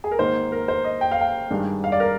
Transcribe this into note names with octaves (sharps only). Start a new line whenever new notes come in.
G#4
A#4
G#2 D#3 A#3 D#4 C5
A#4
C5
D#5
G5
F5
G5
G2 D#3 G#3 D4
F5
D5
A#4